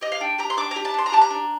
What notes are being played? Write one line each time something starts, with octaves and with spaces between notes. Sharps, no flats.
G4 D#5
F5
D4 G5
G4 A#5
C6
D4 D6
G4 A#5
A5
D4 C6
A#5
G4 A5
A#5
D4